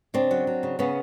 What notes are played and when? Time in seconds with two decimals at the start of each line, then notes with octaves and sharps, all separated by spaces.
0.14 C#3 C4 D4
0.31 F#3
0.47 F#3
0.63 C#3
0.79 C#3 B3 C#4